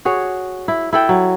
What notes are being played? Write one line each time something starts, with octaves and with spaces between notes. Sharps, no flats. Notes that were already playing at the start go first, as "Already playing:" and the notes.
F#4 G#4 C#5
E4
E4 A4 G5
F#3